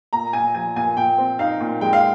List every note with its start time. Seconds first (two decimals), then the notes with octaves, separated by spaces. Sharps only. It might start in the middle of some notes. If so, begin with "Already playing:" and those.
0.13 A#2 A#5
0.33 A#2 G#5
0.54 F3 G#5
0.76 A#2 G#5
0.97 A#2 G5
1.18 C4
1.39 D#4 F5
1.60 A#2
1.81 G#3 G5
1.93 F5